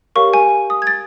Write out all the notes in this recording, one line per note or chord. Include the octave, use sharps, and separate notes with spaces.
G4 A#4 C#5 F5 C#6
G#5
D#6
G#6
A6